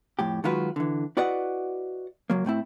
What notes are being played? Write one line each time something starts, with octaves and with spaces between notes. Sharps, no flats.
F2 A2 G4
D#3 F#3 G#3 F4 F#4 B4
D3 E3
E4 F#4 B4 D5 D#5 F#5
C#2 F#3 A#3
A2 A3 C4 E4